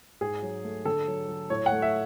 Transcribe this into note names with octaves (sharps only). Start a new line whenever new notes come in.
G#2 G#4
F#3
A3
D3 A4
F#3
F#3
A2 C#5
F#5
A3
E5